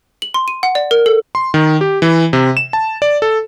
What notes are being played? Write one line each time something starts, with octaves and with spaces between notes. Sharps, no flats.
F#7
C6
D#7
F#5
D5
A#4
A4
C6
D#3
G4
E3
C3
E7
A5
D5
A4